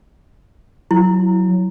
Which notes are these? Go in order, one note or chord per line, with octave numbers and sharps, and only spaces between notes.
F#3 E4